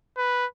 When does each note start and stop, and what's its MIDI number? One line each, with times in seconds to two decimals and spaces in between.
0.17 0.46 71